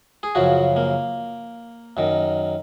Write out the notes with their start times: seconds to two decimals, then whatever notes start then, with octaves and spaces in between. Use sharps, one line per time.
0.23 G#4
0.35 F#2 C#3 F3 F#4
0.76 A#3
1.97 F#2 D#3